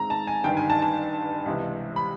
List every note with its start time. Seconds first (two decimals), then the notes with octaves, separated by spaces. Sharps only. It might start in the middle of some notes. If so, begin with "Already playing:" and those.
Already playing: G#2 D#3 G#3 C4 A#5
0.10 A5
0.27 G#5
0.44 G1 G2 D#3 G5
0.57 G#5
0.70 A5
0.82 A5
1.46 C#2 C3 E3
1.96 B5